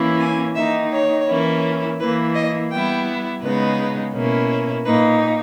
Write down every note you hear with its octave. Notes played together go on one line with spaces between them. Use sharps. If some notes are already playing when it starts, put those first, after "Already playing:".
Already playing: E3 A#3 C#4 E4
G#5
D#3 A#3 D#4 E5
C#5
E3 A#3 C#4 E4
E3 A#3 E4 B4
D#5
G3 B3 E4 G5
C#3 G#3 B3 D#4 B4
B2 A#3 C#4 E4
A#2 A#3 D#4 B4